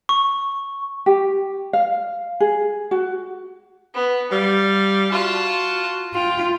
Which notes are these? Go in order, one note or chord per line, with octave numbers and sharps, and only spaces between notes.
C#6
G4
F5
G#4
F#4
B3
G3 F5
F4 F#4 A5
F4 G5